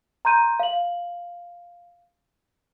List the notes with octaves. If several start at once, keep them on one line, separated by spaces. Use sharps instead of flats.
A#5 C6 G6 D#7
F5 F#7